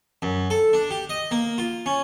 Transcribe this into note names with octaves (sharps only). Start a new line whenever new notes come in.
F#2
A4
D4
G4
D#5
A#3
F4
C#4